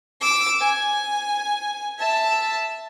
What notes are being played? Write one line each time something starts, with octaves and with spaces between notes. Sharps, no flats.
D6 E6
G#5
E5 A5